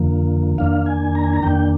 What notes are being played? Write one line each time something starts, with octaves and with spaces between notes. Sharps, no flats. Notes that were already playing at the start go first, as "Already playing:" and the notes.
Already playing: F2 D3 F3 A#3
F2 D#3 A#3 D4 F5
G#5
A#5
G#5
A#5
F2 D#3 A#3 D4 G5